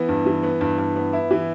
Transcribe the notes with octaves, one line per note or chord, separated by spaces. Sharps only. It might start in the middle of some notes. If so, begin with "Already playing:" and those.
Already playing: E3 B3
G2
E3
B3
G2
G2
B3
E4
E3